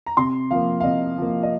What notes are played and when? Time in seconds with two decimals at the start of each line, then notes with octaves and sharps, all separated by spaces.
0.06 A#5
0.17 C3 C6
0.51 F3 A#3 F5
0.80 F5
0.84 C3 D#5
1.18 F3 A#3
1.43 D#5